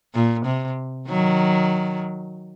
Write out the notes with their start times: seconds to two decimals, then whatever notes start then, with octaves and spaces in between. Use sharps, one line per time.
0.15 A#2
0.46 C3
1.09 D#3 F#3